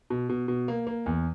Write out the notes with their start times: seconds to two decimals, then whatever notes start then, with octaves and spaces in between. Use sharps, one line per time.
0.10 B2
0.29 B2
0.48 B2
0.68 A#3
0.87 A#3
1.06 E2